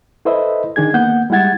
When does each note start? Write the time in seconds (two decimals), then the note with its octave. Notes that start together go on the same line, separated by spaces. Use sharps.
0.25 E4 A4 B4 C5 D#5 E5
0.76 D#3 D4 G#4 G#6
0.94 A#3 B3 F#5 G6
1.30 G3 G#3 E4 F#5 G#6 A6